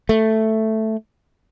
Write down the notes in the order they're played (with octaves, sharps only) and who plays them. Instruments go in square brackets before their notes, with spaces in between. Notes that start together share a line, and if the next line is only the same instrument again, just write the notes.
[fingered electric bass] A3